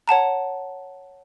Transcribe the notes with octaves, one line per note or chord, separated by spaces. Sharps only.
C#5 F#5 A5 A#5